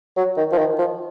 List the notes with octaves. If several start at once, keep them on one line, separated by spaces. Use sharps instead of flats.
F#3
D#3
F3
D#3
F3